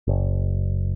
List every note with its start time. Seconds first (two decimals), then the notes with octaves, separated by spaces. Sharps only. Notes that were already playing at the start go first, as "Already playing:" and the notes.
0.07 F#1